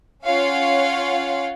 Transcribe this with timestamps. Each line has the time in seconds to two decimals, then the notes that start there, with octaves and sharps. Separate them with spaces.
0.24 C#4 F4 C#5 F5 F#5